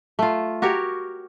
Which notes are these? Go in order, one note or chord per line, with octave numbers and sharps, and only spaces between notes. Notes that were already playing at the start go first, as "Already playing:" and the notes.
A3 F4
F#4 G4 A#4 C#5